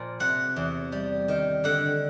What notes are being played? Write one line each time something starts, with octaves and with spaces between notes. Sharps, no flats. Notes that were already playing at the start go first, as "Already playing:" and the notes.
Already playing: A#2 F3
C3 F#5
E2
G3
D#3
D3 F#5